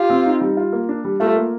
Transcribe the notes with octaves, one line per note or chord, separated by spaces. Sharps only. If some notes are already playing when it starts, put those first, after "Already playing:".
Already playing: F4 G4
C4
D#4
G3
F4
A#3
D4
G3
A3 F4
A#3